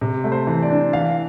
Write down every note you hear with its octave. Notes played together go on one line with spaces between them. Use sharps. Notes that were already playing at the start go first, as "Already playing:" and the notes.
C3
A3
C5
E3
D5
D4
E3 F5